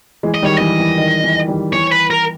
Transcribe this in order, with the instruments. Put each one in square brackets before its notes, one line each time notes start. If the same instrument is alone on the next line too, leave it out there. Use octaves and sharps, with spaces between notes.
[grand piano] E3 G#3
[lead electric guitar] D#5
[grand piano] D#3 G3
[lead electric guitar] C#5
[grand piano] E3 [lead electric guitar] D#5
[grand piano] E3
D#3
E3
D#3 G3
[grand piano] E3 [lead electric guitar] C#5
[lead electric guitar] B4
A#4